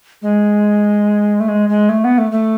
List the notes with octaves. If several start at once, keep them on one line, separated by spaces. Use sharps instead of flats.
G#3
A3
G#3
G#3
A3
B3
A3
A3